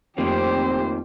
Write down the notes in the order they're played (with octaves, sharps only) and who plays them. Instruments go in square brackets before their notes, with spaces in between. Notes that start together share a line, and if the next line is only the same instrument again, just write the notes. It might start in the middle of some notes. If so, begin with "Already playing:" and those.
[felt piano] F2 A3 [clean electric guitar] D#3 F3 A#3 [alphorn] C4 [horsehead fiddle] G4 C5